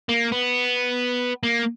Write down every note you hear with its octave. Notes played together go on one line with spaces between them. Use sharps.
A#3
B3
A#3